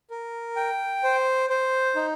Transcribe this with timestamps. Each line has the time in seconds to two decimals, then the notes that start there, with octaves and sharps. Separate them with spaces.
0.10 A#4
0.56 G5
1.04 C5
1.50 C5
1.96 D#4